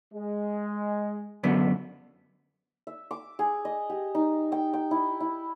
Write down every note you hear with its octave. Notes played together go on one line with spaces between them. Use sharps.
G#3
F#2 D3 B3
E5
D6
G#4
D#5
G4
D#4
G5
G5
E4
E4